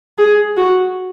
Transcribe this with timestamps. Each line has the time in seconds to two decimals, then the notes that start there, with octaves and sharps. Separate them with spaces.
0.18 G#4
0.57 F#4